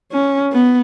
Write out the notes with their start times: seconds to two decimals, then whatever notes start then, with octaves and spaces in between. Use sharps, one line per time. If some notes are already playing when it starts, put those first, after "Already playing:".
0.12 C#4
0.53 B3